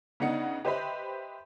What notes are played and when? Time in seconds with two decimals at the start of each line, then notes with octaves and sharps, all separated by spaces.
0.20 C#3 B3 D4 D#4 F#5 C#7
0.65 G4 B4 C5 D#5 E5 B5